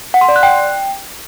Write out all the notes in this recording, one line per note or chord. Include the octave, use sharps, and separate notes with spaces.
F#5
C6
D5
F#6
G5